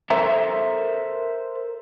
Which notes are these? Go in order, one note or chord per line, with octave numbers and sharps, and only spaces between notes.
A4 A#4 C5 E5 A#5